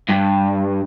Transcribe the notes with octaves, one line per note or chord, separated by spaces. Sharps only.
G2